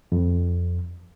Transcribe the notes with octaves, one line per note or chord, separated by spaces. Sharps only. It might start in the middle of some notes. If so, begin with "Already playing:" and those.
F2